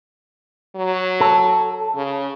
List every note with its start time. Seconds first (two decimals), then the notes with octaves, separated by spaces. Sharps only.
0.76 F#3
1.21 A4
1.95 C#3